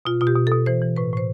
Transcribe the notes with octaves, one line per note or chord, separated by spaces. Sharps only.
B2 F4
B2 F4
G4
B2
B2 A4
E3 C5
E3
A2 B4
A2 C5